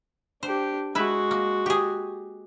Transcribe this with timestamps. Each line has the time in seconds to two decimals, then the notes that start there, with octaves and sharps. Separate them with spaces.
0.43 D4 G4 C5
0.95 G#3 E4 F#4 B4
1.31 A#3
1.66 G4 G#4